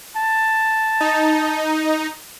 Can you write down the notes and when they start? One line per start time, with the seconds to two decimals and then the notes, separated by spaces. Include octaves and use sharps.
0.17 A5
1.00 D#4